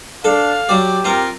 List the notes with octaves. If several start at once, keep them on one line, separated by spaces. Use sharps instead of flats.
D4 A4 F5
F#3 G4 D5
C4 F4 A#4